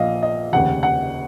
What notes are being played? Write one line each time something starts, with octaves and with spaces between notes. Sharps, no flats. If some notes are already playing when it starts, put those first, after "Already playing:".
Already playing: A#1 A#2 F3 D#5 F5
D#5
F1 D#2 C#3 F#5
F#5